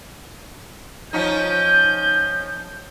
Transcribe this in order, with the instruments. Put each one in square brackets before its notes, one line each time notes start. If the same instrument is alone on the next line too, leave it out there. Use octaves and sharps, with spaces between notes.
[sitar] F3 C#4 D#4 [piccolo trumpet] G6